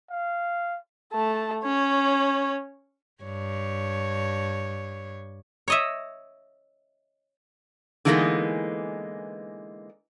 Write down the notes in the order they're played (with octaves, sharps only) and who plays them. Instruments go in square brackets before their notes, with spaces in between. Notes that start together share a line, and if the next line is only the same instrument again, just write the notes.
[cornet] F5
[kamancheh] A3 A5
C#4 C#5
[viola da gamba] G2 C#5
[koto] C#5 D#5 E5
[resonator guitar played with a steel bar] D3 E3 G#3 A#3 B3 D#4